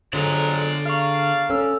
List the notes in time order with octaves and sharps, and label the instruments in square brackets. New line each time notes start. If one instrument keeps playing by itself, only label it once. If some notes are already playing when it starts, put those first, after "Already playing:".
[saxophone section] F2 F#3 G#3 [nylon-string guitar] D3 [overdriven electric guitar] D5 A#5
[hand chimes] G#4 C#6 [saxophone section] F5
[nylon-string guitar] C#4 [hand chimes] A4 E6